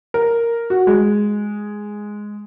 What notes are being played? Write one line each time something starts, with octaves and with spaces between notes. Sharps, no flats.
A#4
F#4
G#3